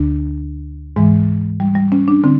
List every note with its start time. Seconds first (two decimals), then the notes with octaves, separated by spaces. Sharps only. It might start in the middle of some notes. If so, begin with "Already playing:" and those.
Already playing: D2 D3 D4
0.96 G#2 E3 G#3
1.60 G3
1.76 G3
1.92 C#4
2.08 D4
2.24 D3 C4